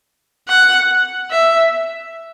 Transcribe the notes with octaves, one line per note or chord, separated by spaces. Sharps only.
F#5
E5